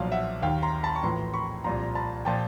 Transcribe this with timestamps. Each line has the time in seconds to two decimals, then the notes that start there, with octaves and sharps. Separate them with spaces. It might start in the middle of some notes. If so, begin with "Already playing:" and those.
Already playing: B1 A#2 F3 F5
0.12 E5 F#5
0.42 D#2 D#3 F5 G5
0.62 A#5 C6
0.83 A5 B5
0.96 C#6
1.03 A#1 A2 E3 A#5 C6
1.34 B5 C#6
1.64 C2 A#2 F3 A#5 C6
1.95 A5 B5
2.25 A#2 F3 G5 A5